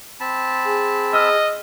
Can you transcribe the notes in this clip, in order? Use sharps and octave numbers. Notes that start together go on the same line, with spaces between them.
C4 A5 B5
G#4
D#5 E6 F6